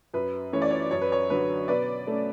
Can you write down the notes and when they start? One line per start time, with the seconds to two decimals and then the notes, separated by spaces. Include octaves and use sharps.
0.14 F#2 B4
0.53 E3 A3 C#4 C#5
0.62 D5
0.71 C#5
0.91 F#2 C#5
1.01 B4
1.12 C#5
1.30 D3 F#3 B4
1.68 B2 B4 D5
2.07 A3 C#4